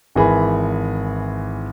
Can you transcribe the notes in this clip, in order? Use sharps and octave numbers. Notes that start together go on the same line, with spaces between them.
G#1 E3 G#4 B5